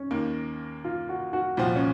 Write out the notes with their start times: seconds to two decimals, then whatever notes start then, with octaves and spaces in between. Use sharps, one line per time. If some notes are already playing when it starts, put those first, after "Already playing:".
Already playing: C#4
0.11 D#2 D#3 A#3
0.84 F4
1.09 F#4
1.33 F#4
1.57 C2 A#2 F3 C4 F4 F#4
1.76 C#4